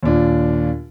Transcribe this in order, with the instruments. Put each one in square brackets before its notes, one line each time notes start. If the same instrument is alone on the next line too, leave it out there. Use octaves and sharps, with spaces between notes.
[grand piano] D#2 A#2 D4 F4